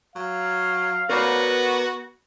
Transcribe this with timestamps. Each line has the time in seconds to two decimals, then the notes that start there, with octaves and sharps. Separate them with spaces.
0.16 F#3 F5
1.09 B3 F#4 A#4 B4 D5